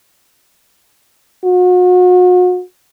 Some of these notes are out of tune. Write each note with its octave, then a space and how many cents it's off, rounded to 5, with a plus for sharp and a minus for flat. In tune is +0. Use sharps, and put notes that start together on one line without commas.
F#4 -40